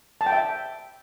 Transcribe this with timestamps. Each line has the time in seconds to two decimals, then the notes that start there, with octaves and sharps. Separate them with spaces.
0.21 A5
0.26 G5
0.32 E5